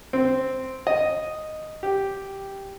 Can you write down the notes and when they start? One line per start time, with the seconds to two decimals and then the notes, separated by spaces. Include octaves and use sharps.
0.13 C4
0.87 D#5
1.83 G4